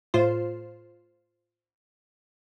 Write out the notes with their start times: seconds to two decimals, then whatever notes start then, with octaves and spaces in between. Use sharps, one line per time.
0.14 A2 F4 C5